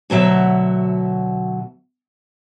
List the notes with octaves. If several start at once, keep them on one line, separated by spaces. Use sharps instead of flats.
D2 B2 F#3 E5